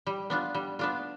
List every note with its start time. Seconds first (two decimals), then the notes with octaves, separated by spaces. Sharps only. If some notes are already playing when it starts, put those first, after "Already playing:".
0.07 G3
0.30 B3 D4 F4
0.55 G3
0.79 B3 D4 F4